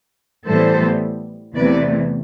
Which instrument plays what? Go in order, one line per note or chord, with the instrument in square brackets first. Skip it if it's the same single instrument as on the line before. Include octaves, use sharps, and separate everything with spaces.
[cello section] A2 E3 G3 B3 A4 C5
E2 C3 E3 A3 B4 D5